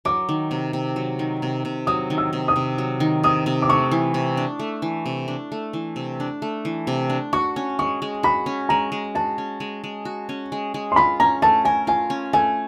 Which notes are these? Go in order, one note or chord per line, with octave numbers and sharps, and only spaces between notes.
F#3 D6
D#3
C3
C3
F#3
D#3
C3
C3
F#3 D#6
D#3
E6
C3
D#6
C3
F#3
D#3
C3 D#6
C3
D6
A3 C#6
E3
C3
D4
A3
E3
C3
D4
A3
E3
C3
D4
A3
E3
C3
D4
F#4 C#6
C#4
G#3 C#6
G#3
F#4 B5
C#4
G#3 A#5
G#3
F#4 A5
C#4
G#3
G#3
F#4
C#4
G#3
G#3
C6
F4 B5
C#4 A#5
A3 A5
A#4 G#5
F4 G#5
C#4
A3 G#5